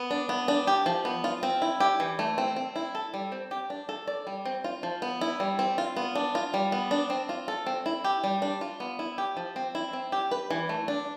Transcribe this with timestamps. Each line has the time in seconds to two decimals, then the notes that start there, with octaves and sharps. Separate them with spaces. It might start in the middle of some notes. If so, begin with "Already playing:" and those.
Already playing: B3
0.11 D4
0.29 B3
0.48 D4
0.67 G4
0.86 F3
1.05 B3
1.24 F4
1.43 C4
1.62 E4
1.80 G4
2.00 E3
2.19 A3
2.38 C4
2.56 C4
2.76 E4
2.95 A4
3.14 G3
3.32 C4
3.51 G4
3.70 D4
3.89 A4
4.07 D5
4.27 G3
4.45 C4
4.64 F4
4.83 F3
5.02 B3
5.21 E4
5.40 G3
5.59 C4
5.78 F4
5.96 B3
6.15 D4
6.35 F4
6.54 G3
6.72 B3
6.91 D4
7.10 C4
7.29 F4
7.48 A4
7.66 C4
7.86 E4
8.04 G4
8.24 G3
8.42 D4
8.61 F4
8.80 B3
8.99 E4
9.18 G4
9.37 F3
9.56 C4
9.75 E4
9.93 C4
10.12 G4
10.31 B4
10.50 E3
10.69 A3
10.88 D4